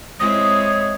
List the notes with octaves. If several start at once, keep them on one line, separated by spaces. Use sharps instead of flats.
G#3 C4 E4 C#5 D#5 D#6